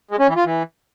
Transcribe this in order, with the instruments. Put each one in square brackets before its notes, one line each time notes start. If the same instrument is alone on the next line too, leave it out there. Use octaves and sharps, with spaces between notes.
[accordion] G#3
C#4
E3
F4
E3